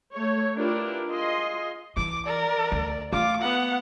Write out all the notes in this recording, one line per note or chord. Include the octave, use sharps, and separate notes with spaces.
A3 C#5
D4 E4 F4 G4 A#4 B4
F4 G#4 D#5 C6
E3 D6
A#4 D5
D2
A3 F4 D6
B3 F#5